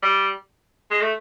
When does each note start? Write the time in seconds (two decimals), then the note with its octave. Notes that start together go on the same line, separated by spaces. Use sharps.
0.03 G3
0.90 G#3
1.01 A3